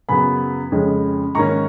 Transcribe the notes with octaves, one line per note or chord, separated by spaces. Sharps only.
F#2 C#3 F#3 B3 G#5 B5
F2 C#3 G#3 C#4
G#2 D#3 A#3 C#4 A#5 C#6